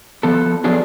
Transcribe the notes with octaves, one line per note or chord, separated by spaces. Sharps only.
F3 B3 A4
F3 F#3 B3 D4 G#4 A4